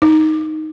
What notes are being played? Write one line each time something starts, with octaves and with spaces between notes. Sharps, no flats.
D#4